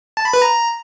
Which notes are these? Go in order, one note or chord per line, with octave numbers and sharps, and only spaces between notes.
A5
B5
B4
A#5